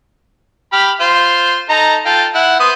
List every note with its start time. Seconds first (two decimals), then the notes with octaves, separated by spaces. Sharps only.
0.73 G4 B5 F6
1.00 F4 C5
1.69 D#4 A4 A#5
2.06 F4 A4 G5
2.35 E4 F#5
2.60 B3 C5 D#6